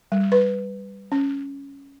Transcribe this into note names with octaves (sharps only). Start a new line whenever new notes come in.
G3
B4
C#4